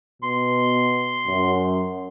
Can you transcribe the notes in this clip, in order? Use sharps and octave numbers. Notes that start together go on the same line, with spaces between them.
B2 C6
F#2